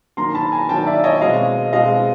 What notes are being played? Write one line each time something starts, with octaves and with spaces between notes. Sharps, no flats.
D#3 F#3 A#3 A#5 C6
A5 B5
G#5 A#5
D#3 F#3 A#3 G5 A5
D5 E5
C#5 D#5
B2 G#3 C4 D#5 F5
B2 G#3 C4 D#5 F5